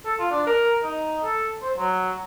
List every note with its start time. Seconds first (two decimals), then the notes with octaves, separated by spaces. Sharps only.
0.05 A4
0.19 F4
0.31 D4
0.47 A#4
0.83 D#4
1.24 A4
1.62 C5
1.78 F#3